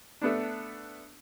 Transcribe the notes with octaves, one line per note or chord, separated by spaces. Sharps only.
A3 B3 D4